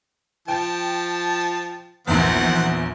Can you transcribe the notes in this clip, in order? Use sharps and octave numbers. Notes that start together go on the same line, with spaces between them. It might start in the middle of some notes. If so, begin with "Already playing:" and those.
F3 G5 A5
A#1 E2 D#3 C4 F#5